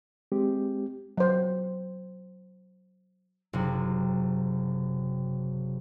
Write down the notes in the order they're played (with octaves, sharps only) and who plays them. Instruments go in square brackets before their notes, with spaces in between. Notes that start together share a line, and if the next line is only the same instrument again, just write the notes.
[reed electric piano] G#3 C4 G4
[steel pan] F#3 C5
[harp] F#1 C3